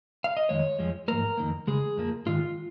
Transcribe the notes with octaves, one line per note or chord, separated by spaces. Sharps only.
F5
D#5
F2 D#3 G#3 C#5
F2 F3 G#3
G#2 F3 A#3 A#4
F2 D#3 A#3
C#3 G#3 G#4
F2 F3 A#3
G#2 D#3 G#3 F4